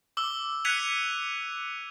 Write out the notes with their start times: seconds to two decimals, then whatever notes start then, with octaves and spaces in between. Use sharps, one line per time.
0.17 D6 E6 G7
0.65 F#6 G#6 B6 C#7 D#7 F7